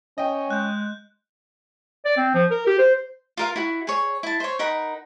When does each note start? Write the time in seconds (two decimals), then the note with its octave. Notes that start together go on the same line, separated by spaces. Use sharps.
0.18 C#4 D#5 G5
0.50 G#3 F#6 G6
2.05 D5
2.17 C4
2.35 F3
2.51 A#4
2.67 G4
2.79 C5
3.37 F4 A#4 F5
3.56 E4 F#4
3.87 G#4 C#5
4.23 E4 A5
4.40 C5 C#5
4.59 D#4 A#4 F#5 B5